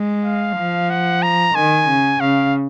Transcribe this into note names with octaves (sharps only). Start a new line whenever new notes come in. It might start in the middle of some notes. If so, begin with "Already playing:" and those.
Already playing: G#3
F5
F3
F#5
A#5
D#3 G#5
C#3
C#3 F5